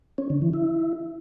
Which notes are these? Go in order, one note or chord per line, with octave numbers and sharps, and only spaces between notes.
C#4
D3
E3
E4